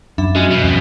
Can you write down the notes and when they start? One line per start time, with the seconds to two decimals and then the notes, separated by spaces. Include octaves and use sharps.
0.18 F#2 D4 E5 B5
0.36 G#3 C#4 F#4
0.51 G2 B2
0.64 F2